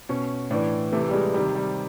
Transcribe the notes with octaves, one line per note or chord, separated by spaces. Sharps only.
B2 C#4
A2 E3 D4
C3 E3 A3
G3
G#3
C3 D#3 G3
G3